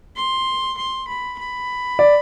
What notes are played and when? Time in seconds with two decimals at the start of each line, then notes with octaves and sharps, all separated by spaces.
0.16 C6
0.77 C6
1.07 B5
1.38 B5
1.99 D5